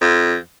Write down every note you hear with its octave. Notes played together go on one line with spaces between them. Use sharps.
F2